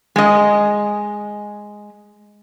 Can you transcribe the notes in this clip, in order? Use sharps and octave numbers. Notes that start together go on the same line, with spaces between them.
G#3 D#5